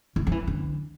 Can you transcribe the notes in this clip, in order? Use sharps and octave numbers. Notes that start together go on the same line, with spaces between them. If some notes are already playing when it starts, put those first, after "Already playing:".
E3
F3
E3
D3